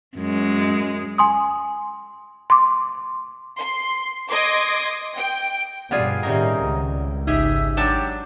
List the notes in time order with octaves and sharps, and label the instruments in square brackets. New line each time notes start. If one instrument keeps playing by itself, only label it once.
[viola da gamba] F#2 G#3
[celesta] G#5 C6 D#6
[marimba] C6 D6
[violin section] C6
D#5 C6 D6 G#6 A#6
G5
[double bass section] G2 B2 D3 [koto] G3 F4 G#4 [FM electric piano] D5 F#5
[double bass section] A2 D#3 G3 [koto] C3 C#4 A#4 [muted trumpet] D#4
[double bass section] C#2
[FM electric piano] G#1 D#4 [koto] G4 G#4 [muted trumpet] E5
[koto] F#3 D4 A5 [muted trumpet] G4